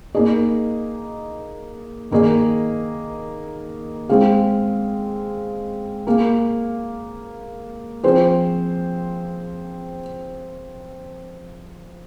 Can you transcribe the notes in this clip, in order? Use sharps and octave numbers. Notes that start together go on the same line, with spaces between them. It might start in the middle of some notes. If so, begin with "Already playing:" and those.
A#3 D#4 G#4 D#5
D#3 A#3 G#4 D#5
G#3 C4 G#4 F5
A#3 G#4 F5
F3 C4 G#4 C5